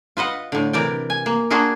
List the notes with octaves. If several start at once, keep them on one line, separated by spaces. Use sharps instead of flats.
F4 B4 D#5 F#5
A2 D3
C3 E3 A#4 D5 G5
G#5
A#3
A#3 D4 F4 F#4 G#4 A#4